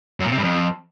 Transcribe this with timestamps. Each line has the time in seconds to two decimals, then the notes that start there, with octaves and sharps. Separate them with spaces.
0.20 F#2
0.26 A#2
0.32 C3
0.38 G2
0.44 F2